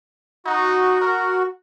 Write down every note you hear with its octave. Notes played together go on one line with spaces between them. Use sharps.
D#4 F#4
A#4